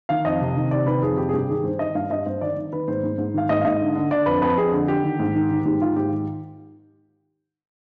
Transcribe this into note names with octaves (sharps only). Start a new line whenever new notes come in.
D#3 F5
F2 D#5
C3
D#3
C3 D5
D#3 B4
F2 G#4
C3 G4
G#4
G2 G4
D#3 G#4
G2 C5
D#3 D#5
G2 F5
G2 D#5
G2 C5
D#3 D5
D#3
D#3 B4
G#2 C5
G#2
G#2
D#3 F5
G#2 D#5
F5
G#2 D#5
D3
D3
D3 D5
F2 B4
F2 B4
F2 G#4
D3
D3 G4
D#3
G#2
D#3
D#3
G#2 G4
D#3 F4
G#2 G4
D#3